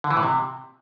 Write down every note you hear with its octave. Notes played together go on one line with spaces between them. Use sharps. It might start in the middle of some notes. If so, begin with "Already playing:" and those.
D3
E3
A2
C3